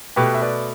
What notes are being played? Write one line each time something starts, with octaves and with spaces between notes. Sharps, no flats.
B2 A3 G4 B4
E5
B4 D5